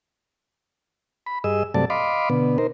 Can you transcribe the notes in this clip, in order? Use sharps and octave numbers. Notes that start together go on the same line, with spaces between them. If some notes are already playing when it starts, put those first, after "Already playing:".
B5
G2 G#4 D#5 E6
G2 C3 F#3 A3 D5 A5
D#5 F5 B5 C6 D6
B2 D3 B3
D#4 A#4 C5